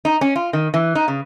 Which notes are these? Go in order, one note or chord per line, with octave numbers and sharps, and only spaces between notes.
D#4
C#4
F4
D#3
E3
D#4
C#3